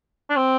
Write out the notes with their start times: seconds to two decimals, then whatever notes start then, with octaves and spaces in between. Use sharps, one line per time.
0.29 D4
0.36 C4